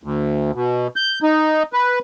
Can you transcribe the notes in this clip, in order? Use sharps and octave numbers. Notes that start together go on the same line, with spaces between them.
D2
B2
G6
D#4
B4